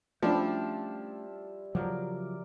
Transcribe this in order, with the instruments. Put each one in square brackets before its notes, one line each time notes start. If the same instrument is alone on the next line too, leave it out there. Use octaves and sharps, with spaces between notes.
[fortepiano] F3 D4 [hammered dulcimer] G3 E4 [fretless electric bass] A3 C#4
[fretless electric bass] C#3 F3 F#3 [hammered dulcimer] A#4 D5